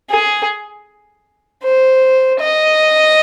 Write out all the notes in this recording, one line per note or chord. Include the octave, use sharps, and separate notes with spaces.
G#4
C5
D#5